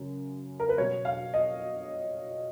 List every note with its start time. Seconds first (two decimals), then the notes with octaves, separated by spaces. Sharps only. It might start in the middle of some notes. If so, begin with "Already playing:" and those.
Already playing: F#2 C#3
0.60 A#4
0.69 B4
0.78 B2 F#3 C#5
1.05 F5
1.34 D#5